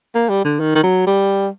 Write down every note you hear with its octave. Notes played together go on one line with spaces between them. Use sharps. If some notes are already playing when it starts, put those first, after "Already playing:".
A#3
G3
D3
D#3
D#3
F#3
G3